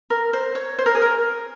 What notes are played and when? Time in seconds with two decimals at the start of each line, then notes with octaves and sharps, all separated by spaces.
0.10 A#4
0.33 C5
0.55 C#5
0.78 C5
0.86 A#4
0.95 G#4
1.02 A#4